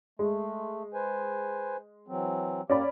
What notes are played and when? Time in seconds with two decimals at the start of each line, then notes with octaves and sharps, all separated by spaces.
0.19 G#3 A3
0.94 B4 C5 G#5
2.08 E3 F#3 C4
2.70 A#3 C#4 G4 D5 B5